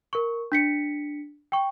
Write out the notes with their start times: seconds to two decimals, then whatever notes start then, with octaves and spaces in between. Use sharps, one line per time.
0.13 A#4 C#6
0.52 D4 B6 C#7
1.52 G5 C#6